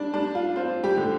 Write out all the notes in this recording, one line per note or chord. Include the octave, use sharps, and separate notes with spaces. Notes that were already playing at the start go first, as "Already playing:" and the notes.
Already playing: F2 G3 D4
G3 D4
F4
C4 F4
G3 G4
D3